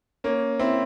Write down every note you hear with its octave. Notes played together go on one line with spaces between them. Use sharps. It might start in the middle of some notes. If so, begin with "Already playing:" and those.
A#3 C#4
C4 E4